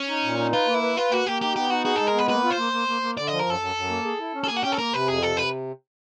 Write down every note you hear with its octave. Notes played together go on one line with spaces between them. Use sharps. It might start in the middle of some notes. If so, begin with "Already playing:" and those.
Already playing: C#4
D#4
A#2
D#4
F4 B4
A#3
E4
B4
F4 B4
A#3 F#4
A#3 G4
D#4 G4
B3 G4
D#4 F#4
F#4 G#4
G#3 A4
A#4
B3 B4
A#3 B4
F4
C5
A#3
A#3
A#3
A#3
D3 D5
F3 D#5
A#4
F#2 A4
F#2
F#2
A#3
G#4
E4
C#4
A4
A#3 G#4
F#4
C#4 G4
A4
A#3 A#4
C3 B4
F2 G#4
C3 A4
C3 B4